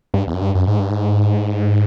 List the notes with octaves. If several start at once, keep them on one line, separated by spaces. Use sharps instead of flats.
G2
E2
F#2
G2
F#2
G#2
G2
G#2